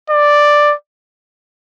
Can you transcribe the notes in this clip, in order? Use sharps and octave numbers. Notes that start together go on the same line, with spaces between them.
D5